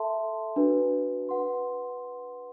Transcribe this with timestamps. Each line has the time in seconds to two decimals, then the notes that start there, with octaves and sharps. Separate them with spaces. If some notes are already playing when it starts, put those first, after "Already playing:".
Already playing: A4 E5 A5 C6
0.56 D4 F#4 B4
1.29 B4 F#5 C6